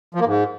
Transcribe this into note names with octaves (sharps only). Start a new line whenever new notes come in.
F3
A#3
G#2